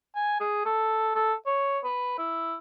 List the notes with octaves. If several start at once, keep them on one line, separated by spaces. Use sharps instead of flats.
G#5
G#4
A4
A4
C#5
B4
E4